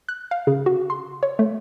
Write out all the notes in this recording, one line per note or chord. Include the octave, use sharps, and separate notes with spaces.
F#6
F5
C#3
F#4
C6
C#5
A3